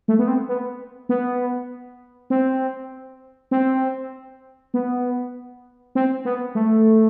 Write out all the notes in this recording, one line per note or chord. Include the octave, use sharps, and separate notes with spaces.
A3
B3
C4
B3
B3
C4
C4
B3
C4
B3
A3